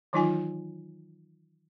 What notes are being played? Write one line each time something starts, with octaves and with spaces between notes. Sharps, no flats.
D#3 E3 F#3 D#4 F4 G#5